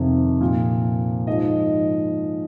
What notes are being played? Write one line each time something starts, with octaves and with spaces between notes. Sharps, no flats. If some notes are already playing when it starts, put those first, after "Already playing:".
Already playing: F2 C3 D#3
A#2 F3
G#2 F3 D#5